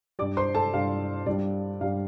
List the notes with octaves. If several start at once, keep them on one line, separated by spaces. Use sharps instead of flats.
G2 G3 D5 D6
C5 C6
A4 A5
G2 G3 F5
G2 G3 D5
G2 G3 F5